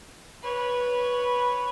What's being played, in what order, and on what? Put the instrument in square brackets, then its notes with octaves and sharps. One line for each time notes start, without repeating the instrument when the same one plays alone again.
[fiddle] B4 C#5